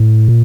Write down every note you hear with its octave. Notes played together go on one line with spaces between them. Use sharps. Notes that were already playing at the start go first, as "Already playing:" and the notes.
Already playing: A2
A#2